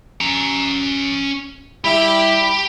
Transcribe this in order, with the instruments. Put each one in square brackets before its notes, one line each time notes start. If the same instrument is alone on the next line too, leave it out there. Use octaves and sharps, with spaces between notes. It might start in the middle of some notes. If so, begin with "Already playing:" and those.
[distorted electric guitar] C#4 A#5
[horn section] G3 E4 [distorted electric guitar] G4 [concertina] B5